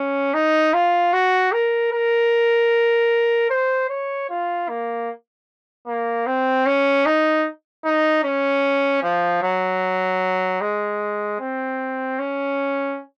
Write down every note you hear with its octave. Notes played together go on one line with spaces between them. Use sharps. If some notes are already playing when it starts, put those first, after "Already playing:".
Already playing: C#4
D#4
F4
F#4
A#4
A#4
C5
C#5
F4
A#3
A#3
C4
C#4
D#4
D#4
C#4
F3
F#3
G#3
C4
C#4